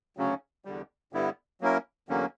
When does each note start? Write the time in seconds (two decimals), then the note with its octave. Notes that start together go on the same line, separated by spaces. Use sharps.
0.17 D2 C#3 F#3 C#4
0.65 E2 D3 G3
1.13 G2 D3 G3 B3 E4
1.61 F#3 A#3 C#4 E4 A#4
2.09 E2 D3 F#3 A#3 C#4